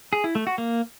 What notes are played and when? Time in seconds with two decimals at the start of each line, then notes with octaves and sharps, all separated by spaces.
0.13 G#4
0.24 E4
0.35 A3
0.47 F#4
0.58 A#3